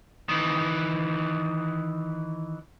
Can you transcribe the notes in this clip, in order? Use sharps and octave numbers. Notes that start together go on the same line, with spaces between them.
D#3 E3